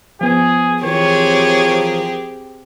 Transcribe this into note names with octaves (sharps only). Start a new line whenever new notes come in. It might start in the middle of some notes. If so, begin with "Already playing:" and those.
F3 B3 G#4
E3 F3 C4 G4 G#4 A#4 C#5